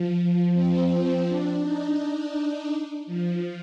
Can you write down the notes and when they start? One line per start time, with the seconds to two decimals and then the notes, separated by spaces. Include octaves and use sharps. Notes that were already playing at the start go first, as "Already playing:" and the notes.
Already playing: F3
0.18 F3
0.54 C4
0.90 C4
1.27 D4
1.62 D#4
1.99 D4
3.07 F3